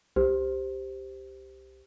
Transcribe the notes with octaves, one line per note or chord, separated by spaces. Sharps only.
C2 G4 C5